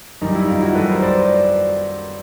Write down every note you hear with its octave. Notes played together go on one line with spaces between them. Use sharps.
F#2 D#3 G3 D#4
E4
D#4 F4
E4 F#4
F#2 D#3 G3 A4 B4
A#4 C5
C5 D5